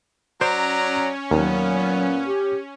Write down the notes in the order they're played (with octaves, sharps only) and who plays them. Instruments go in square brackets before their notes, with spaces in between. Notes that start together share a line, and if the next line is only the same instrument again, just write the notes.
[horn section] F#3 D5 A#5 [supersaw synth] C#4 [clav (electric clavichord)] C5
[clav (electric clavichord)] D#2 [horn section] A#2 B3 [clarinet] F#3
[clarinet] G4